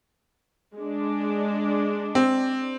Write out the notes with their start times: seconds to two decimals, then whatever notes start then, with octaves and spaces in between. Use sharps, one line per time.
0.75 G#3 D4
2.15 C4